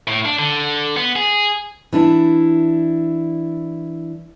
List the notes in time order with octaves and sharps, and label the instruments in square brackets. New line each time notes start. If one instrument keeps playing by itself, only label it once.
[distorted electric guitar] A2
D4
D3
B3
G#4
[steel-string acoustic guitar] E3 D4 E4